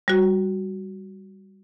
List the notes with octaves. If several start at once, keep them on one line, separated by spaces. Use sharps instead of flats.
G3 F#4